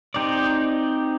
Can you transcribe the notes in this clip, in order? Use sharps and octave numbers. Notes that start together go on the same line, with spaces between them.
C4 D#4 G4 D5